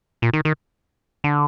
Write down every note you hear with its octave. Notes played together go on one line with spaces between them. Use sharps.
A#2
D#3
D#3
D3